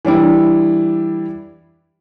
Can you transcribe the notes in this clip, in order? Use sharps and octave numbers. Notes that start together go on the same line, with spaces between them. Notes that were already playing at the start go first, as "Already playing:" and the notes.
E3 G3 D4 E4